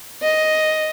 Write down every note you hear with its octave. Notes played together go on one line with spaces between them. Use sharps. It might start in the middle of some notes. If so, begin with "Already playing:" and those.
D#5